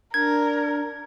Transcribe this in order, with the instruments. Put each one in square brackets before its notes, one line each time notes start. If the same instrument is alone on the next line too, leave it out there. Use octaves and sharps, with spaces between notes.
[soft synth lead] D4 [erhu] A#4 [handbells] G#6